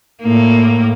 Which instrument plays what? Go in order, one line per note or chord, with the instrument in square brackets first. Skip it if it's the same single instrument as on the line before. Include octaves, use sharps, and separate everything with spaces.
[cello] A2 A#3